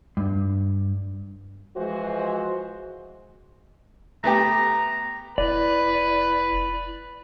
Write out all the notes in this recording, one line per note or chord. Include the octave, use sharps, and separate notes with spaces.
G2
E3 F3 G#3 F#4 C5
A3 B3 G4 A#5
F1 E4 B4 D5